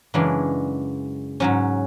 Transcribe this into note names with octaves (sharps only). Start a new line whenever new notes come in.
F#2 C#3 E3 G#3 D4
G#2 F#3 C#4